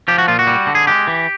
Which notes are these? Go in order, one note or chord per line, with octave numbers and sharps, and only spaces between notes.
F3 G4
F#4
A#2 F4
F#4
G3
D3
G#4
G#3 G4
E3